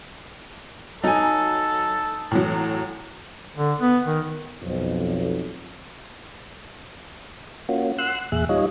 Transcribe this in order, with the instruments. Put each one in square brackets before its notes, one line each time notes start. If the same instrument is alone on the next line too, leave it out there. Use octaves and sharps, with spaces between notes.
[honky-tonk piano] F#3 [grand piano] D#4 G#5 [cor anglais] A4
[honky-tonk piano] A2 E3 F#3
[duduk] D3
B3
D#3
[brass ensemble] B1 F2
[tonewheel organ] A#3 C#4 F4 F#4
F#5 C6 E6 F#6
E2 A#2 G#4 E5 F#6
G3 D#4 F4 C#5 D#5